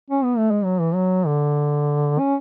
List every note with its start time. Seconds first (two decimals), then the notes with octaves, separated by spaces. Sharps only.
0.10 C#4
0.24 B3
0.38 A3
0.51 G#3
0.65 F#3
0.80 E3
0.94 F#3
1.26 D3
2.19 C#4